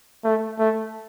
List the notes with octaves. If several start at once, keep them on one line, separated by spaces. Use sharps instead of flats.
A3
A3